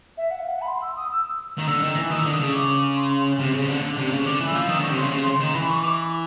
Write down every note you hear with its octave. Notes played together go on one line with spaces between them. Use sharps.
E5
F#5
F5
F#5
B5
C6
E6
D#6
E6
D#3
D3 E6
D#3
E3
D#3 D#6
E6
D3 D#6
C#3
D6
C6
C6
C3
C#3
D3
D3
C3
C#3
D3 D6
E3
E6
F3
D#3 D#6
D3 C#6
C3
C#3 C6
C#3
D#3
E3 B5
C#6
D6